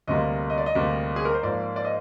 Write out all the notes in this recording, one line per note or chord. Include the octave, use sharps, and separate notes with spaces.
D2 C3 G3 A#3 D#5
D#5
D5
D#5
D2 C3 G3 A#3
G#4
A#4
C5
G#2 F3 A#3 D5
D5
D#5